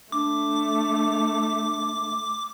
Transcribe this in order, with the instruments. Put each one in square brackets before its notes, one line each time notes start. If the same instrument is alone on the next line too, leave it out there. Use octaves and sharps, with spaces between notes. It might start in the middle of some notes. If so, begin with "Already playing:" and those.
[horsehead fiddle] A3 [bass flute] D4 [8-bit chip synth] D6